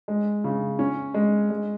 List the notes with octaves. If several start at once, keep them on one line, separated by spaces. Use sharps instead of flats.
G#3
C#3
C#4
G#3
G#3